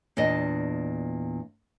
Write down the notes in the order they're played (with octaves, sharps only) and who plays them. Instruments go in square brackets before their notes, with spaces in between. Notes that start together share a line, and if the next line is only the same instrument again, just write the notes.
[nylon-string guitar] E2 A#2 D4 D#5